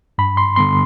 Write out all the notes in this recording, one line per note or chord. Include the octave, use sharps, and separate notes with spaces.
G2 B5
C6
D3 G3 B3 C6